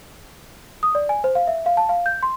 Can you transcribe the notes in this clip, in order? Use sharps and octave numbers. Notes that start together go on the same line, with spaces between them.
D#6
D5
G#5
C5
F5
E5
F5
A5
F5
G6
C6